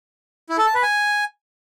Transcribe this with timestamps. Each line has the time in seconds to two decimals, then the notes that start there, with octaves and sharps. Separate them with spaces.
0.49 E4
0.58 A4
0.66 A5
0.74 B4
0.83 G#5